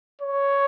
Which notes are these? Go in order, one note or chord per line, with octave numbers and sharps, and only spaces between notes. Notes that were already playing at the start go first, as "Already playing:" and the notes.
C#5